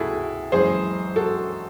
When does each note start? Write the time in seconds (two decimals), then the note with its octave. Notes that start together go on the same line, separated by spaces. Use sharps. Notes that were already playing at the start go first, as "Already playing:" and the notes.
Already playing: C#2 C3 E4 F#4 G#4 A4
0.52 F#1 F#2 E3 G#3 G#4 C5
1.16 F#4 A4